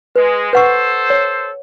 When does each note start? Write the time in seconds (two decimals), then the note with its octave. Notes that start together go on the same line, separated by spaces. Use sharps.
0.16 G#3 B4
0.53 A4 B4 C5 F#5 C#6
1.10 C#5